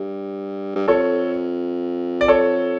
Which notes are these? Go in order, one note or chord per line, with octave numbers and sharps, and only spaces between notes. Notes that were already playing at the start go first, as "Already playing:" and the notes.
Already playing: G2
G2
F2 A4 C#5
D5
A4 C#5